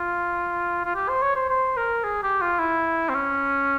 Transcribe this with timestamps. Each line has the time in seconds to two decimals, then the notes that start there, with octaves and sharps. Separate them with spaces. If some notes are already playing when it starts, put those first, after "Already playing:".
Already playing: F4
0.85 F4
0.95 G4
1.09 C5
1.22 C#5
1.36 C5
1.50 C5
1.77 A#4
2.04 G#4
2.23 G4
2.41 F4
2.60 E4
3.09 C4
3.15 C#4